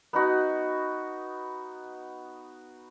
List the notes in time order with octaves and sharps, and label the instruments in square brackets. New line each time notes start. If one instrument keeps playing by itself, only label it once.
[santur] B3 D#4 F#4